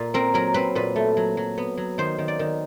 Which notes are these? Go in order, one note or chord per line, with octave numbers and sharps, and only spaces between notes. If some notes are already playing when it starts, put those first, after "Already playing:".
Already playing: A#2
C4 A#4
F#3 A#4
C4 B4
A#2 B4
A3
F#3
F#3
B3
F#3
D#3 C5
D#3
D5
D#3